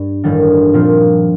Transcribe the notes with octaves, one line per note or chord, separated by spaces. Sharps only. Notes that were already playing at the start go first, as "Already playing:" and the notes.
Already playing: G2
A1 G2 D#3 G3 D4
A#2 F3 C4 F4